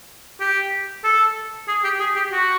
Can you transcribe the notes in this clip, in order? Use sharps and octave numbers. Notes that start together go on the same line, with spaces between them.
G4
A4
G#4
G4
G#4
G4
F#4